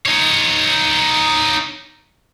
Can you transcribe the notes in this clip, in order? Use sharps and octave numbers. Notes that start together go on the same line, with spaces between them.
D#4 C#5